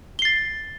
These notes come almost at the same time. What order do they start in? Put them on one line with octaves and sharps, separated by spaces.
G7 C7 A6